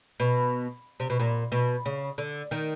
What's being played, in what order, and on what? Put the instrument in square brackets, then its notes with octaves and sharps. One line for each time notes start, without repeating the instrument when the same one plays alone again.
[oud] B2
C3
B2
A#2
B2
C#3
D3
D#3